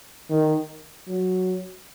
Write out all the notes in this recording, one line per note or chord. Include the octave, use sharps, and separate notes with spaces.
D#3
F#3